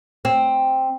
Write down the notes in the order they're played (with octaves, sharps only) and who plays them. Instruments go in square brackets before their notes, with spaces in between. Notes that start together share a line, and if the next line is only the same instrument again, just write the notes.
[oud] C4